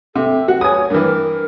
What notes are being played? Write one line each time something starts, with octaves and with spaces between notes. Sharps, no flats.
C3 A4
F#4
C#5 G#5 D#6
G2 E3 A#4